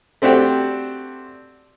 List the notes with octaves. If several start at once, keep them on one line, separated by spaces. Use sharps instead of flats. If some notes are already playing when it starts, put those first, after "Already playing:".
A3 C4 D4 F#4 G4 G5